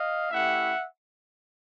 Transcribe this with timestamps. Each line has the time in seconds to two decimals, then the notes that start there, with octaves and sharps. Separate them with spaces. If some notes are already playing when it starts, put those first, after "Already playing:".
Already playing: D#5 F5
0.32 A3 C#4 E4 G4 E5 F#5